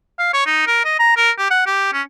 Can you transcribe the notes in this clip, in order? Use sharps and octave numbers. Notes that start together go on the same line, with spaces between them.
F5
C#5
D#4
A#4
D#5
A#5
A#4
G4
F#5
G4
C#4